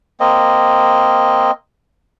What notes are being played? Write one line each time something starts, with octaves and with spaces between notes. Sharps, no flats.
A#3 C4 D#5